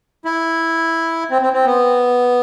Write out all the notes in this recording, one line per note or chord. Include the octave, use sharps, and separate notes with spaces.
E4
C4
C4
C4
B3